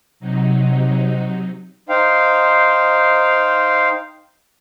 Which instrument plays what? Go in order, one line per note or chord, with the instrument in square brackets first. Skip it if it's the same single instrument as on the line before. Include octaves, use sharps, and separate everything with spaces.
[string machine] C3 F#3 D#4
[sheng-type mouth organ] D#4 C5 F5 G5